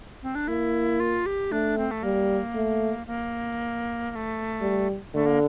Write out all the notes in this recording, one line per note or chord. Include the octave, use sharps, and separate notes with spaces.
C4
D4
A#3 E4
F4
G4
A3 D4
C4
A3
G3 A#3
A3
A#3
A#3
A3
G3
D3 A3
A#3